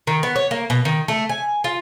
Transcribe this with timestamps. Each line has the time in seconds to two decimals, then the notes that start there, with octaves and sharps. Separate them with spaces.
0.07 D#3
0.23 B3
0.36 C#5
0.51 A#3
0.70 B2
0.85 D#3
1.08 A3
1.29 G#5
1.64 F4